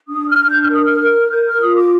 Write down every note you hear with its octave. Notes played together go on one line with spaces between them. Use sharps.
D4 D#6
F6
D4
G6
F6
A#4 D#6
F6
A#4
A#4 G6
F6
F4 D#6
D6